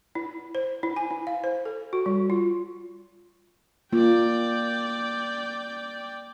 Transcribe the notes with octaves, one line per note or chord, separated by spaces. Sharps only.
E4
C5
E4
G#5
E4
F5
C5
A4
F#4
G3
F4
A#3 F4 D5 G5